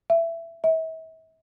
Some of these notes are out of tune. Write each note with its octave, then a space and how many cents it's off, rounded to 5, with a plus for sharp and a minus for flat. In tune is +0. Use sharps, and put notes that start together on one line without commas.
E5 +15
E5 -40